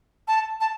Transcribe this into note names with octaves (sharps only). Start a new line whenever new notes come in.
A5
A5